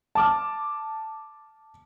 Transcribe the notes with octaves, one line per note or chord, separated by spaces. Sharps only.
A5 D6 F6